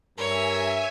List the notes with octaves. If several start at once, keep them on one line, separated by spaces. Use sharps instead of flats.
G2 A#4 C#5 E5 G#5